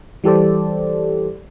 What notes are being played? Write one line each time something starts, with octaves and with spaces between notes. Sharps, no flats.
E3 G3 G4 A4 C5 D5